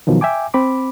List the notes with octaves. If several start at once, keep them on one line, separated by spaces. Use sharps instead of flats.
B2 D#3 F3 F#3
E5 G5 G#5 D6
C4 B5 D6